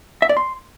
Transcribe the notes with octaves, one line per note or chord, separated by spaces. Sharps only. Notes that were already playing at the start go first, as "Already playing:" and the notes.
E5
D5
C6